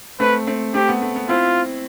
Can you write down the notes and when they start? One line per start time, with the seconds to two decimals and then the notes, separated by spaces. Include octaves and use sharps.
0.20 A3 C4 B4
0.47 A3 C4
0.74 A3 C4 G4
0.88 B3
1.02 A3
1.16 B3
1.29 C4 E4 F4